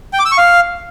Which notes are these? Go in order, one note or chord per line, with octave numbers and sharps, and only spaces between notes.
G5
D6
E6
C#6
F5